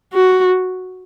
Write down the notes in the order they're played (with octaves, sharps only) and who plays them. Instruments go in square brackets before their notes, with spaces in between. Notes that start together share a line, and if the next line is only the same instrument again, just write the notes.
[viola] F#4